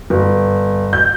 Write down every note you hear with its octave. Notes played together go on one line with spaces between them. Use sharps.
G1
G6